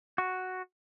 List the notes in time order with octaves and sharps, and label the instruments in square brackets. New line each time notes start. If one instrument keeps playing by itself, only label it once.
[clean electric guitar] F#4